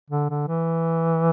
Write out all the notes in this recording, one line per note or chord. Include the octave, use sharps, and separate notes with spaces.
D3
D3
E3